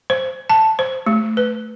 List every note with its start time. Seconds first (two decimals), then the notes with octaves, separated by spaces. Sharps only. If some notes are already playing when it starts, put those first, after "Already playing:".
0.10 C5
0.49 A5
0.79 C5
1.06 A3
1.37 B4